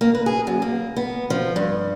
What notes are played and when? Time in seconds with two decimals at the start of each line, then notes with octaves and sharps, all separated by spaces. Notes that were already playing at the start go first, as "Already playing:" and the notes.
0.01 A#3
0.15 B4
0.26 G#4
0.47 F#2
0.62 A#3
0.96 B3
1.30 F3
1.56 G2